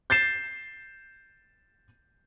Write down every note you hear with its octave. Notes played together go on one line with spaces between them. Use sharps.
G6 A6 C7 E7